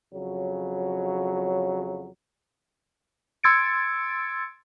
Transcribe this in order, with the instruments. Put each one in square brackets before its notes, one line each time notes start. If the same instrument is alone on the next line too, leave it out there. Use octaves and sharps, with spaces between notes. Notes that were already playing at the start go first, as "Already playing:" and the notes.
[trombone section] F2 C#3 F#3
[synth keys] C6 E6 G#6 A6 C#7 D7